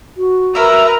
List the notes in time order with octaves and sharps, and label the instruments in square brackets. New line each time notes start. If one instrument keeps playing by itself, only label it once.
[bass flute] F#4
[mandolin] E4 E5 [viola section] A#4 B4 A#5